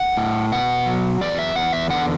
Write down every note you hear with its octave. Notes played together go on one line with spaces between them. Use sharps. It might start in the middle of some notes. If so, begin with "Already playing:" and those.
Already playing: F#5
A2
B2 F#5
F#3
E2 D5
E5
E2 F#5
E5
D3 F#5